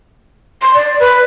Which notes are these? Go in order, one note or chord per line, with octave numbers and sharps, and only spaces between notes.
C6
D5
B4